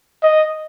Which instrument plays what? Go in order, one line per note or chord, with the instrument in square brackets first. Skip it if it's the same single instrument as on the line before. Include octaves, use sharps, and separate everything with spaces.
[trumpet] D#5